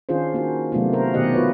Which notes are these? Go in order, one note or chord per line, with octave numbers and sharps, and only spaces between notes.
D#3 C#4 D4 F4 G#4 C5
A#3 D#4 F#4
C3 F#3 A3 B3 D4 F4
F#4 A#4 C5
B2 D#3 G4 D5 D#5 F#5
F4 F#4 B4 C#5